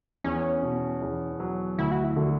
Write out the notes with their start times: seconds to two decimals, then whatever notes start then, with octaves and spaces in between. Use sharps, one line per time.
0.24 E2 C#4
0.63 B2
1.02 E2
1.40 F#3
1.78 D2 E4
1.92 F#4
2.04 E4
2.16 D3 F#4